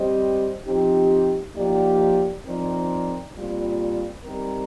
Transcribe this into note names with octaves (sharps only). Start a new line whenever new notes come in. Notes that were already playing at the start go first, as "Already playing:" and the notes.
Already playing: G3 C4 G4 C5 D#5
F3 C4 D#4 G4
F3 A#3 D#4 G4 D5
F3 C4 D#4 A#4 D5
A#2 G3 C4 F4
G3 C4 D#4 A#4